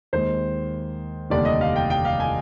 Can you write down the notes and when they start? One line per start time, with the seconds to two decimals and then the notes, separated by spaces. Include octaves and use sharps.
0.13 D#2 D#3 G#3 C5
1.30 F1 D#2 D3 G3 D5
1.45 D#5
1.61 F5
1.76 G5
1.90 G5
2.05 F5
2.20 G#5